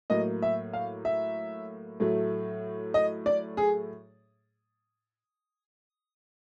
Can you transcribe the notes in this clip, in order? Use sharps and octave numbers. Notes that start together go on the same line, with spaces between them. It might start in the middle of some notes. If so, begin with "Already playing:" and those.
A2 F#3 A#3 D#5
E5
F5
E5
A2 F#3 A3
D#5
D5
G#4